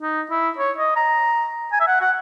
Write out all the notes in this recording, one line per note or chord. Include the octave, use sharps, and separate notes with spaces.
D#4
E4
C#5
D#5
A#5
G#5
E5
F#5
F#5